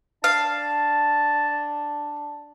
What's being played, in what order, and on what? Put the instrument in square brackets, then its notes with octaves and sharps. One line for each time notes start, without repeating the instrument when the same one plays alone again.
[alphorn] D4 [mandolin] F5 [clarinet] A5